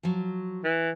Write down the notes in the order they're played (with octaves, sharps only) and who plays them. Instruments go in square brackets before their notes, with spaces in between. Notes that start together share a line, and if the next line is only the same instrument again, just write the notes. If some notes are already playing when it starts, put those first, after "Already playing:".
[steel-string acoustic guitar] F3 F#3
[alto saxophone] E3